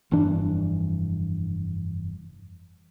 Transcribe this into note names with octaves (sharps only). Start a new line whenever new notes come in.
F1 G2 E3 D4